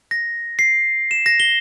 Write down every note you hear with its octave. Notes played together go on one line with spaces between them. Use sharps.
A#6
C7
E7
A#6
G7